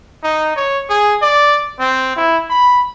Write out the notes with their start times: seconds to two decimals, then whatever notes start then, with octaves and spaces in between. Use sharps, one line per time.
0.24 D#4
0.56 C#5
0.89 G#4
1.22 D5
1.79 C4
2.16 E4
2.50 B5